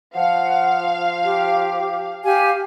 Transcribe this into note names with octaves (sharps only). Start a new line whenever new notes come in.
F3 F5 F#5
G4
G4 F5 G#5